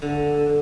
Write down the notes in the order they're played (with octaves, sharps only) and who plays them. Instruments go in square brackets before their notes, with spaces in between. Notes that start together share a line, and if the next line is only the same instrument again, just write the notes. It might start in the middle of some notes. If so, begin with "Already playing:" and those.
[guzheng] D3